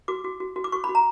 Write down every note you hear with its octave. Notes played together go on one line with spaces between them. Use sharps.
F#4 D6
F#4
F#4
F#4
D6
F#4 C#6
B5
F#4
A#5